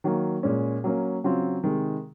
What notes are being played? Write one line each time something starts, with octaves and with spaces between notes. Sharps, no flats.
D#3 F#3 A#3
A#2 G#3 C#4
F#3 A#3 C#4
C#3 F#3 C4 F4
C3 D#3 G#3